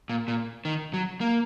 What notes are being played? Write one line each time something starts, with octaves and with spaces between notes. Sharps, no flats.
A#2
A#2
D#3
F#3
A#3